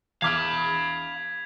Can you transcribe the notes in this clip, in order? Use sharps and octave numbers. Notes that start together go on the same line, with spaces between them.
E2 F5 B5 D6 F6 G#6 B6 F7